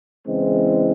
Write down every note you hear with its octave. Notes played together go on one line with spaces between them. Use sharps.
E2 C#3 E3 G#3 C4